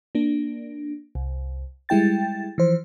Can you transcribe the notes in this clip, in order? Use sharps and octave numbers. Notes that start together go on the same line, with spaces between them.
A#3 D4
C2
G3 G#3 E4 G5 A6
E3 F3 C5